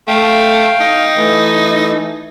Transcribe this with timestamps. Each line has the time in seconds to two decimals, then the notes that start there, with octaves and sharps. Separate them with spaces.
0.08 A3 F5 G5
0.81 D#4
1.16 E3 A3